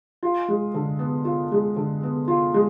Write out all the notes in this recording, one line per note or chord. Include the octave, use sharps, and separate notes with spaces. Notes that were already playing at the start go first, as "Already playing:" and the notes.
F4
G#3
D3
B3
F4
G#3
D3
B3
F4
G#3